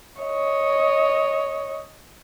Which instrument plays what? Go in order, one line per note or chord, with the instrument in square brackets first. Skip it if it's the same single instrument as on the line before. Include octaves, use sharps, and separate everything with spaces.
[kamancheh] C#5 D#5